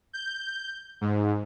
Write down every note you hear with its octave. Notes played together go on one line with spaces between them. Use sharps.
G6
G#2